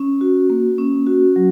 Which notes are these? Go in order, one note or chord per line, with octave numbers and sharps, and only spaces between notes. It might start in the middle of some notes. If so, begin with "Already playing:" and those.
Already playing: C#4
F#4
A#3
C#4
F#4
F#3